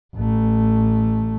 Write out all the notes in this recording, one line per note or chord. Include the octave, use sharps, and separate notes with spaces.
A1 A3